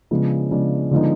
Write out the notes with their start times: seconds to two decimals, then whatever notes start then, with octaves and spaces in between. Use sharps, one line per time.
0.11 C#3 F3 G#3 B3 D4
0.51 C#3 F3 G#3 B3 D4
0.91 D3 F3 G#3 B3 D#4